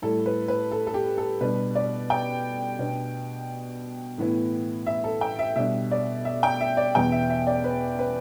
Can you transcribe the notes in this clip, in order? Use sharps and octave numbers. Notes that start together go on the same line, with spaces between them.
A2 G3 E4 A4
B4
B4
A4
A4
G4
A4
B2 G3 D4 B4
D5
G5
B2 B3 D4
A2 E3 B3 E4
E5
A4
G5
E5
B2 G3 D4 E5
D5
E5
G5
E5
D5
E2 B2 B3 G5
E5
E5
D5
B4
B4